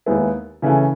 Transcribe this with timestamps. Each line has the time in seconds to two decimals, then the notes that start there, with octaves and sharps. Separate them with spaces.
0.06 D#2 D#3 G#3 B3 E4
0.62 C#3 E3 A3 C#4